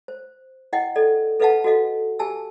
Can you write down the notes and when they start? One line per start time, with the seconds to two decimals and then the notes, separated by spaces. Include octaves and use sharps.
0.08 C5
0.73 E4 D#5 F#5 G5
0.96 A4 D5 D#5
1.40 A4 B4 D#5 F5 F#5 A5
1.64 F#4 A4 D#5 F5
2.19 G4 G#5 A5 E6